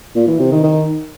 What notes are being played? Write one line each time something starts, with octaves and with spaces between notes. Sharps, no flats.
A#2
E3
C3
D#3
D#3